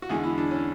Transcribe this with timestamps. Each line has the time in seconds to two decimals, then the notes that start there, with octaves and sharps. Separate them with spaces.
0.02 F#4
0.09 E2 D3 G#3 G#4
0.24 E4
0.38 D4
0.51 C#4